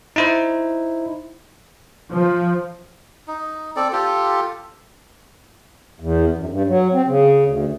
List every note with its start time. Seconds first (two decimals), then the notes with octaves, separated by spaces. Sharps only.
0.16 D#4 E4 C5
2.12 F3
3.28 D#4
3.76 C4 A4 D5
3.93 F4 G4 A4
6.00 E2
6.37 F#2
6.49 G2
6.68 F#3
6.93 C4
7.07 C#3
7.44 D2